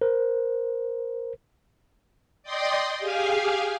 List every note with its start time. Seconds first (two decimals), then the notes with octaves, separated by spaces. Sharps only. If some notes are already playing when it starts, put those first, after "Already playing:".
0.01 A#4 C5
2.43 D5 D#5 G5 C6 D#6
2.99 G4 G#4 F5 G#5